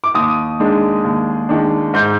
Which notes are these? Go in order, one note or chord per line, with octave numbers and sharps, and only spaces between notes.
D6
D#2 D#6
D#3 G#3 D4
D#2
D#3 G#3 D4
G#2 G6